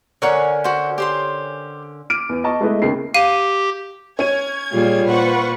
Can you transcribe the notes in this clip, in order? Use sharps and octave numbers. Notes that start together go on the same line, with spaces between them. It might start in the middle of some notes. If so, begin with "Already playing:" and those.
D3 C#4 A#4 C#5 F#5 C#6
F#4 C5
G4 C5 C6
D6 F6 D7 D#7
E2
D#5 A5 C#6
G#3 A3 B3 E4 B4 D#5
D#2 C#3 C7
G4 F5 D#7
C#4 G#6 D#7
A#2 G3 F4 G#4
A#2 F4 B4 C5 F#5 C#6